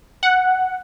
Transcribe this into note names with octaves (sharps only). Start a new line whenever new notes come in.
F#5